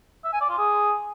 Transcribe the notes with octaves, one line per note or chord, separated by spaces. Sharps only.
E5
G#5
D5
F4
G#4